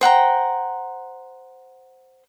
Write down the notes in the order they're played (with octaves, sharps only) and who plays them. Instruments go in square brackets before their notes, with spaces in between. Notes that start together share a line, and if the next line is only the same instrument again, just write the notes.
[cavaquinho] C5 F#5 G5 A#5